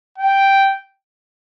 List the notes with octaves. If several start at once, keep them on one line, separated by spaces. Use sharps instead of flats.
G5